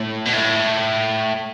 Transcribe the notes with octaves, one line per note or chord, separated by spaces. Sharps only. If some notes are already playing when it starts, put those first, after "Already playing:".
Already playing: A2
B2
A2